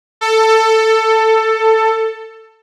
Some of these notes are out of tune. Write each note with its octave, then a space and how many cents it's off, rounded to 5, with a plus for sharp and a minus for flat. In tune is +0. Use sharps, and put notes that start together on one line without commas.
A4 +15